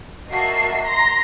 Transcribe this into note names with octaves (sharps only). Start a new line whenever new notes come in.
A#3 F#4 D#5 E5 A5 C7
A#5 C6 A#6 C7